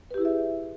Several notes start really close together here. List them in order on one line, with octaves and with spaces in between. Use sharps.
B4 G4 E4 G#4 E5